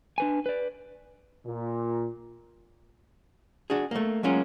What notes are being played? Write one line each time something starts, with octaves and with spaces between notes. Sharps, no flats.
D4 B4 G#5
B4 D5
A#2
D4 F#4 G#4
A3 A#3
F#3 G#3 A#3 C#4 F4